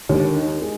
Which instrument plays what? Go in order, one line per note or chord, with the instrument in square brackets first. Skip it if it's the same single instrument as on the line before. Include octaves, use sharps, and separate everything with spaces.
[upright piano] D#2 [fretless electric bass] D3
[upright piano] D#4
G#3